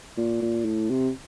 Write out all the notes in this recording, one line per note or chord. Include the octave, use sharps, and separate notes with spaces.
A#2
A#2
A2
C3